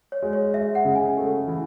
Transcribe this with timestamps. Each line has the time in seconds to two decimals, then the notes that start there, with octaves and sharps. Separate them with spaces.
0.12 C#5
0.22 G#3
0.33 C#5
0.53 G#3 E5
0.75 F#5
0.85 C#3
0.96 G#5
1.17 A3
1.47 E3